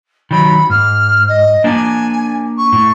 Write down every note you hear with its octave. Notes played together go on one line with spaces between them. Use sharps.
D#3 F#3 B5
G#2 F6
D#5
A#3 D4 G#5
C#6
A2